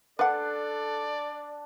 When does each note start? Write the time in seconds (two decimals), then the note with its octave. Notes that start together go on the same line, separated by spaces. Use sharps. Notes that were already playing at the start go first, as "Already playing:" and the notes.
0.19 D4 A4 B4 D5 F#5